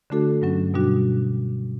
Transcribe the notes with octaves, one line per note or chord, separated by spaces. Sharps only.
D3 A3 D4 F#4 A4
G2 F#3 C#4
B2 G3 D4 F#4